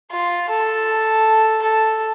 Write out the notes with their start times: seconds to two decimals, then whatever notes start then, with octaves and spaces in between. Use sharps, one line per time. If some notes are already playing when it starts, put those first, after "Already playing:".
0.11 F4
0.50 A4
1.63 A4